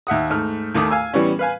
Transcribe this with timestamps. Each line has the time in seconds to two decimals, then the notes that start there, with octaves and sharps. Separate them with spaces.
0.07 D#2 E5 F#5 D#6
0.30 G#2 A3 F6
0.75 D#2 D#3 A3 D6 D#6
0.91 F5 G#5 E6
1.14 E3 G3 B3 C#4
1.39 B4 F5 G#5